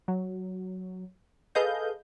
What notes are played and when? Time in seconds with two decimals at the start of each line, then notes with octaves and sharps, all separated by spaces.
0.08 F#3
1.55 G#4 A4 B4 D#5 F5 G6